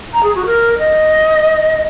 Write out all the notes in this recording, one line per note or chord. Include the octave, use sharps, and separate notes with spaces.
A#5
G#4
F#4
A#4
D#5